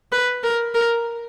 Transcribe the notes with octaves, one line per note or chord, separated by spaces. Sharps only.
B4
A#4
A#4